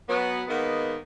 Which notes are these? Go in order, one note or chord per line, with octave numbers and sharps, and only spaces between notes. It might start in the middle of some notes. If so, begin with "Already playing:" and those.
F#3 B3
D#3 G#3 A#3 B3